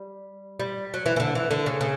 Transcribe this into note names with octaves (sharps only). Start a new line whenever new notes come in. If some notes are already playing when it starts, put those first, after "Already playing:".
Already playing: G3
G3
F#3
E3
E3
D3
E3
D3
C#3
C#3